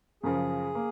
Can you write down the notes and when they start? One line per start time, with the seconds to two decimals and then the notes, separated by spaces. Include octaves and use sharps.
0.23 F#2 C#3 F3 G#4
0.75 A#3